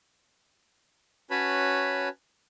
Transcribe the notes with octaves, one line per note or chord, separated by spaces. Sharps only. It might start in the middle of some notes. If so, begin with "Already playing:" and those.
C#4 F#4 B4 C#5 A5 B5